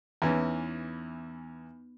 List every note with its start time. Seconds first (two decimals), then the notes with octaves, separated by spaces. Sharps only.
0.22 E2 E3 B3 C#4 D#4